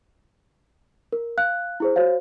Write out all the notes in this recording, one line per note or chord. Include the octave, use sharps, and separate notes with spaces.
A#4
F5 F#6
E4 G#4 C5
F#4 C5 C#5 F5